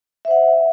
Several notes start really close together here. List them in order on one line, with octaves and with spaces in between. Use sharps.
E5 C5 F#5